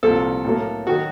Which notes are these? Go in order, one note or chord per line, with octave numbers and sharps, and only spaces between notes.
C2 A#2 F3 A4
A2 F#3 A#3
D#3 F#3 F#4